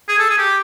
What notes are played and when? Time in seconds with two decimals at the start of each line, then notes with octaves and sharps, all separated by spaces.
0.08 G#4
0.19 A4
0.30 G#4
0.38 G4